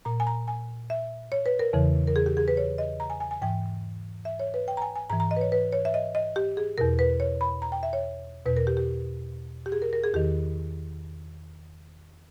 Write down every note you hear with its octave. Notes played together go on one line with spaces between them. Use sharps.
A#2 A#5
G#5
A#5
G#5
E5
C#5
B4
A#4
E2 C#3 E3
A#4
G#4
G4
G#4
B4
C#5
D#5
A#5
G#5
G#5
G#5
G#2 E3 G5
E5
C#5
B4
G5
A#5
G#5
G#5
G#2 E3 A#5
A#5
D#5
B4
C#5
B4
C#5
E5
D#5
D#5
G4
G#4
E2 B2 A#4
B4
C#5
B5
A#5
G5
E5
C#5
E2 B2 B4
A#4
G4
G4
G4
G#4
A#4
A#4
G#4
E2 D#3 G4